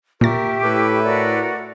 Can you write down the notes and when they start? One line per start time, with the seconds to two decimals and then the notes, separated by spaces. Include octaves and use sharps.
0.21 A#2 G4 A#4 E5 C#6 A6
0.64 A2 E4 A4 B4
1.03 F#4 A#4 D5